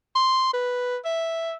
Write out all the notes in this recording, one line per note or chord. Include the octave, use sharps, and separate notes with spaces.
C6
B4
E5